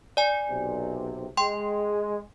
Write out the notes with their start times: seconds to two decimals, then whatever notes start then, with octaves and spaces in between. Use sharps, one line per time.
0.17 D5 G#5
0.48 B1 C3
1.37 G#3 G5 C6